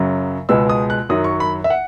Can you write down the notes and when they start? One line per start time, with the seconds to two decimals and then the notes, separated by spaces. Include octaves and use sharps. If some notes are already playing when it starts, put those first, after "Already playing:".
Already playing: F#2 C#3 F#3
0.49 C#2 B2 G#3 B3 E6
0.70 D#6
0.90 F#6
1.09 F#2 D#3 F#3 D#6
1.24 C#6
1.40 B5
1.64 E5
1.70 F#5